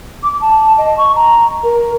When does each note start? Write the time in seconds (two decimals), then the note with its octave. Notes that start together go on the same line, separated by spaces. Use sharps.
0.23 D6
0.41 A5
0.77 D#5
0.97 C#6
1.15 A#5
1.63 A#4